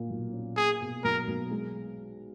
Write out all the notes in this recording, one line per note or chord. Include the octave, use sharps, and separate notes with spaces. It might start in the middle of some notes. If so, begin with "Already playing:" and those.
Already playing: A#2 A#3
B1
C#4
A#3 G#4
B2
B1 A#4
B1
G#3